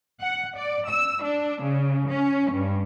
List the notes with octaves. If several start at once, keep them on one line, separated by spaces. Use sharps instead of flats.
F#5
D5
E6
D4
C#3
C#4
G2